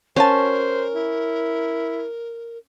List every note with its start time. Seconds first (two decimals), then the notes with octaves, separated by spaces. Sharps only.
0.16 F#3 C#4 F#4 A#4 C5 A5
0.95 E4